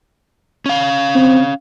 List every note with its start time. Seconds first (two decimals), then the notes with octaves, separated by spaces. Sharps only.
0.66 C#4 F5
1.15 C4